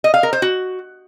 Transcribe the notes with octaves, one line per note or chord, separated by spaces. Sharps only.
D#5
F5
A#4
C5
F#4